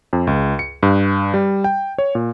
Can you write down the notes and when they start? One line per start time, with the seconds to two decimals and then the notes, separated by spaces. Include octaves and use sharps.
0.13 F2
0.27 C#2
0.59 C#7
0.83 G2
1.34 G3
1.64 G5
1.98 C#5
2.15 A#2